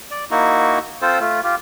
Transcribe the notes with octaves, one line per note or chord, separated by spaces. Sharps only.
D5
A#3 D#4 E4 F#4
C4 F4 A4 C5
A3 F4
F4 G4